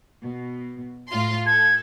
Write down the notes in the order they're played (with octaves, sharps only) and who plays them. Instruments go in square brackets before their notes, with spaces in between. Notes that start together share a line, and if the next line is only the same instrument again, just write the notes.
[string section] B2
A2 F4 C6
[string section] A4 [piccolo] G#6